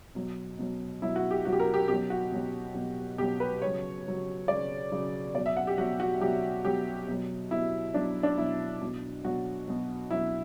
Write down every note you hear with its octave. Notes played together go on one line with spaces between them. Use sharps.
B2 F#3
B2 F#3
B2 F#3 E4
F#4
G4
B2 F#3 F#4
G4
A#4
G4
B2 F#3 G4
F#4
B2 F#3
B2 F#3
B2 F#3 G4
B4
C#3 F#3 C#5
C#3 F#3
C#3 F#3 D5
C#3 F#3
B2 F#3 D5
E5
F#5
G4
B2 F#3 F#4
F#4
B2 F#3 G4
B2 F#3 G4
B2 F#3
B2 F#3 E4
B2 F#3 D4
D4
B2 F#3 E4
B2 F#3
B2 F#3 F#4
B2 F#3
B2 F#3 E4